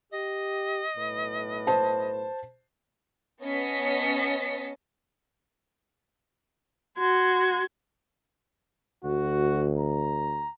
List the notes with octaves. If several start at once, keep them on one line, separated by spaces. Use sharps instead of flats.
G4 D#5
B1 A2 B4
C5 A5
B3 C#4 D#5 A5 B6 C#7
F#4 C6 G#6
D2 F#4
A#5